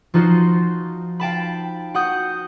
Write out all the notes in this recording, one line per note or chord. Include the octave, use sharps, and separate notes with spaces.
F3 D#4 F4 F#4 C5
F5 G5 A5 B5
F#4 F#5 D#6 G6